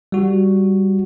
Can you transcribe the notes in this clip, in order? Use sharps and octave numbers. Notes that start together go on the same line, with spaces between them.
G3 F#4